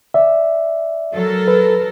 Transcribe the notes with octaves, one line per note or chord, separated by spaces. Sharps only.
D5 E5
F#3 A4 A#4
B4